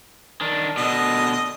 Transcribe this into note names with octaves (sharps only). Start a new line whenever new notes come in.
D#3 D4
B2 D3 D#5